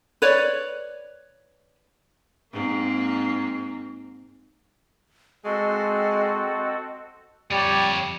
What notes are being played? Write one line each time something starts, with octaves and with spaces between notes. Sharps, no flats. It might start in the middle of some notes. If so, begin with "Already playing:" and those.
B4 C#5 D5
G#2 A#3 C4
G#3 C4 F#4 A4 D#5
F2 G3 C#5